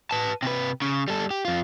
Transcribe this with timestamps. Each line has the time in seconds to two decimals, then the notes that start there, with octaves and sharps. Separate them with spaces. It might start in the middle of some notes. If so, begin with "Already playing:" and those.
0.11 B4 A5
0.43 C3 B4
0.82 C#3
1.08 G3 A4
1.31 G4
1.45 F2 F4